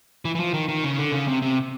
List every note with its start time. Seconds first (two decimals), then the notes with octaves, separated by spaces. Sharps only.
0.25 E3
0.35 E3
0.40 F3
0.54 D#3
0.69 D#3
0.84 C#3
0.99 D3
1.12 C#3
1.28 C3
1.42 C3